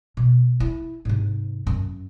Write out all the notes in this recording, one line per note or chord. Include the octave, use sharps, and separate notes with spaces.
B2
E4
G#2 C3
F#2